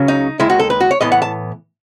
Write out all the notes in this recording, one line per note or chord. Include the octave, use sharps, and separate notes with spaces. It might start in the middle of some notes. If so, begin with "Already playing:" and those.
Already playing: C#2 C#3 F#3 C#4
D#4
D#2 D#3 G#3 E4
F#4
A4
B4
F#4
C#5
A2 E3 B3 D#5
F#5
A5